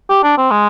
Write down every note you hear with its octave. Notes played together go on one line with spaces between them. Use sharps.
G4
D4
C4
G#3